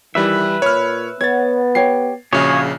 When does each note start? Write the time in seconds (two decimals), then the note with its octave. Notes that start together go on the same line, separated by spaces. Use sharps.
0.15 D#3 E3 G3 E4 B4 E5
0.62 A#2 C#5 B5 F6
1.21 B3 C#5 F#5 G#6 A6
1.75 G4 C#5 C7
2.33 A#1 C#3 F#4 G#4 C#5 F5